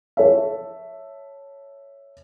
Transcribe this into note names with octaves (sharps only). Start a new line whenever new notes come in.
A4 C#5 E5